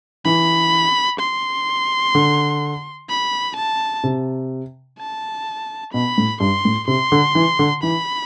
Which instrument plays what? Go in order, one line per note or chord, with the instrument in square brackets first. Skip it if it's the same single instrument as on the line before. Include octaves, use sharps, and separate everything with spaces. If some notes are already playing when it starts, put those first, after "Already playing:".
[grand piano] E3 [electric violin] B5
[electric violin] C6
[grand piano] D3
[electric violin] B5
A5
[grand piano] C3
[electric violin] A5
[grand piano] B2 [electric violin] B5
[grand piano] A2
[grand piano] G2 [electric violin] C6
[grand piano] A2
[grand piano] C3 [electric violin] C6
[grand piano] D3
E3
D3
[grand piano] E3 [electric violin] B5